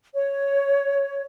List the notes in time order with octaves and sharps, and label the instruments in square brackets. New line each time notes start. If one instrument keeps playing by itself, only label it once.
[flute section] C#5